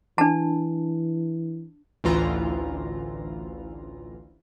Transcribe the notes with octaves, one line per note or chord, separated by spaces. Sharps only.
E3 D4 A5
A1 D2 E3 F4 A#5